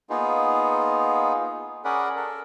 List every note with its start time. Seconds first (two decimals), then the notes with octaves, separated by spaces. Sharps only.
0.10 A#3 B3 D#4 F4 G#4
1.85 C#4 G#4 A#4 D5 F#5 B5
2.16 A4 A#4